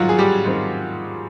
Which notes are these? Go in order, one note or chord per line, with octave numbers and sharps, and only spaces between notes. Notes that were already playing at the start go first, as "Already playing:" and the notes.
Already playing: G#2 D#3 F#3 G3 F4 F#4
G#4
G3 G4
G#2 D#3 G3 C4